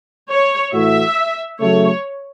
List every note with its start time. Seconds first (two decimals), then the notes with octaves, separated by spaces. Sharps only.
0.30 C#5
0.73 A2 E3 A3 F#4 E5
1.60 C#3 F#3 A3 C#5